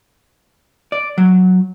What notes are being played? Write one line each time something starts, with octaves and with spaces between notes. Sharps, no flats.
D5
F#3